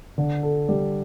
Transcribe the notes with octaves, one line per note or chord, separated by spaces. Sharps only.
D3
A4
G3